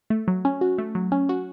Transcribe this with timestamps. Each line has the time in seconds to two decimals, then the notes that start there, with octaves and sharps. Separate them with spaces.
0.10 A3
0.28 F#3
0.45 C#4
0.61 F#4
0.78 A3
0.95 F#3
1.12 C#4
1.29 F#4